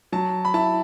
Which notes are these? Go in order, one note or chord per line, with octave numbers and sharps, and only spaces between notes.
F#3 A5
B5
E4 A5